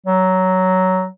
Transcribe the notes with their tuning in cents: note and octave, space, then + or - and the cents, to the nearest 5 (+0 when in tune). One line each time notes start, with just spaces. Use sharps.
F#3 +10